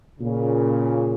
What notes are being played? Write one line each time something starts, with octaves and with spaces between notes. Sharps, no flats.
A#2 C#3